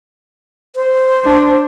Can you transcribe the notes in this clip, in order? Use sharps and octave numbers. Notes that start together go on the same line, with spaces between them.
C5
D4